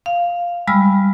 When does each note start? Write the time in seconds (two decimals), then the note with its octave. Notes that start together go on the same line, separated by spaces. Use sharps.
0.06 F5
0.67 G3 G#3 B5 E6 F6